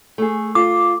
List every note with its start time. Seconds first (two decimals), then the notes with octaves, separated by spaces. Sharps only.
0.18 A3 G#4
0.55 F4 D6